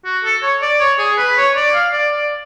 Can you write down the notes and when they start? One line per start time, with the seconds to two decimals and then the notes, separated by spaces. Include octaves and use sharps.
0.05 F#4
0.24 A4
0.43 C#5
0.62 D5
0.80 C#5
0.99 G#4
1.18 B4
1.37 C#5
1.56 D5
1.74 F5
1.93 D5
2.11 D5